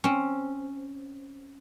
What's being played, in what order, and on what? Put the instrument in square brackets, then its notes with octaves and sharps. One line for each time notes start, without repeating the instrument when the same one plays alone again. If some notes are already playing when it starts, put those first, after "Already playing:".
[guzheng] C4 C#4